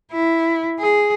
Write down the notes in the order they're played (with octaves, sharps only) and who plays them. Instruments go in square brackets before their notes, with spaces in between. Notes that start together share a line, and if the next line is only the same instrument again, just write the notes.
[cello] E4
G#4